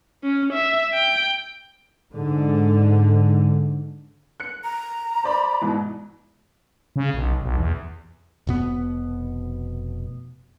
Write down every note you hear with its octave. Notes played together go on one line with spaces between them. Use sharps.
C#4
E5
G5
G#2 D3
F#6 C#7
A#5
C5 D5 B5
G#2 B2 E3
C#3
B1
B1
E2
F1 B2 B3